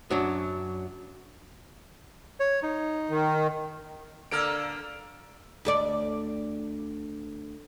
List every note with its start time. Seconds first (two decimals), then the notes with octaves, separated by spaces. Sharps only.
0.11 F#2 F#3 D4
2.40 C#5
2.63 D#4
3.10 D#3
4.31 D3 A#3 A4 E6 F6 D7
5.65 D2 A4 D5